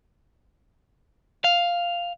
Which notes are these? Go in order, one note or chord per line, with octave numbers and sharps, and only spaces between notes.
F5